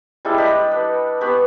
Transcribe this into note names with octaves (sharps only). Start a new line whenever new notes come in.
G3 G#3 E4 A4
D4 G4 D#5 B5
B4
B3 G4 B5 C#6